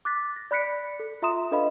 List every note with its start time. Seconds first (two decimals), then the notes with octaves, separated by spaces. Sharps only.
0.05 D6 F#6 A6 B6
0.36 A#6
0.51 D5 B5 F#6 B6 C#7 D7
1.00 A4
1.22 F4 E5 A#5 C6 D#6 E7
1.51 D4 A4 B4 D#5 F5 B5